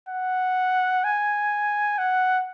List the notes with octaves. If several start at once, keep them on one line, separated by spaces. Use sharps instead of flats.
F#5
G#5
F#5